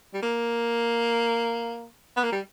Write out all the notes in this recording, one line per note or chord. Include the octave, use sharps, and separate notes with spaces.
G3
A#3
B3
A#3
G3